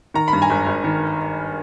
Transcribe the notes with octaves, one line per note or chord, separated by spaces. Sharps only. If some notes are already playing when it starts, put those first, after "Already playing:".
D#3 A#5
B5
G2
G#5 A#5
G#1
G#1
D#3